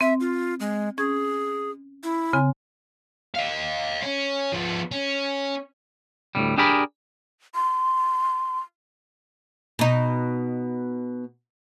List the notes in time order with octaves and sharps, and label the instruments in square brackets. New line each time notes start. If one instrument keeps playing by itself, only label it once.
[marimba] C4 [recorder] E5
[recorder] F4
G#3
[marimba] C#4 G#6 [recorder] G#4
[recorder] E4
[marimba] C#3 C4 G#5
[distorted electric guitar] D#5 F5
C#4
F3 B3
C#4
[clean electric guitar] D2 A2 C3 G3
D4 G4 G#4 A#4 D5 B5
[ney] C6
[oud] B2 D#4